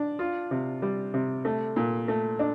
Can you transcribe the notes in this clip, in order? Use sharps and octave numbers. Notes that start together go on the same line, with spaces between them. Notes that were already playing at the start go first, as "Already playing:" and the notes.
Already playing: D4
F4
C3
G3
C3
A3
A#2
A3
D4